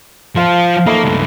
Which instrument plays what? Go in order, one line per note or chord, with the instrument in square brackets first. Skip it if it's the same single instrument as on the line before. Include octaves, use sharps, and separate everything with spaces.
[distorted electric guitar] F3 [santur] C5 F5 A5
[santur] A3 D#4 B5 [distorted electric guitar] A#3
[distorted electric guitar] C#2 G2 [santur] C6